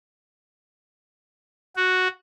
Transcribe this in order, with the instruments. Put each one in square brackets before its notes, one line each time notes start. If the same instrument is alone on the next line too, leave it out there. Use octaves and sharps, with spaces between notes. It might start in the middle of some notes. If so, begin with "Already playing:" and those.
[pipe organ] F#4